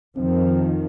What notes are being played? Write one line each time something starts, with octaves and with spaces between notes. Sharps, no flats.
F2 D#3 F3 C4